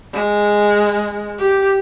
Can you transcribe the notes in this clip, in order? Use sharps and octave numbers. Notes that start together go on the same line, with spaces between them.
G#3
G4